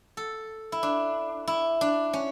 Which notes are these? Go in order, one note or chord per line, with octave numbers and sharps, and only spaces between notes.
A4
E4
D4
E4
D4
C#4